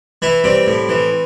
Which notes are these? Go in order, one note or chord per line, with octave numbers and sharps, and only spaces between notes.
E3 E4
G3 C4
A2
E3